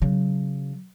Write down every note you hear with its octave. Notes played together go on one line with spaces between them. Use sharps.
C#3 F#3